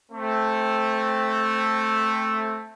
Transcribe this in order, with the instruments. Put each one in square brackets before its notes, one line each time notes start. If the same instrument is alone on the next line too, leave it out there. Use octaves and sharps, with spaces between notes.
[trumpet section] A3 C4